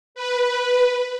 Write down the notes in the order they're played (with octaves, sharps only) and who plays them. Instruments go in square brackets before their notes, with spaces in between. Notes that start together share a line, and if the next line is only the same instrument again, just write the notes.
[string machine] B4